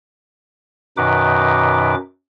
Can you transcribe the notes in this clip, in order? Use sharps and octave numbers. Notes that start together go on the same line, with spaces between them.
F#2 B2 D#3 D#4 B4 D6